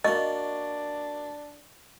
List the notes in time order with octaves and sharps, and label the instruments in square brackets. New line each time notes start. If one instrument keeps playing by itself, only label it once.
[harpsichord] A#3 F#4 [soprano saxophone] D4 [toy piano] D#5